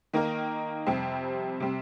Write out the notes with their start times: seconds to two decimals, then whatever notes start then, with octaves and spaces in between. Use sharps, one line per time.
0.14 D#3 A#3 D#4 A#4
0.87 F2 C3 G3 C4
1.60 C3 G3 C4